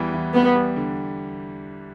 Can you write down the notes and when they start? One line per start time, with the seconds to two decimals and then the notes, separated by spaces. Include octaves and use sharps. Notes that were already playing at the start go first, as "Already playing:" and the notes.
Already playing: E2 E3 G3 B3
0.14 E3
0.34 G3 B3
0.56 G3
0.76 D3